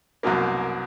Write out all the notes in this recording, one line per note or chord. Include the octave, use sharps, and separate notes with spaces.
C2 F#2 B2 A#3